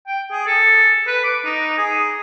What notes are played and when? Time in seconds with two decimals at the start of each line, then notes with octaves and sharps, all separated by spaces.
0.07 G5
0.31 G#4
0.47 A4
1.07 B4
1.24 D6
1.45 D#4
1.78 G#4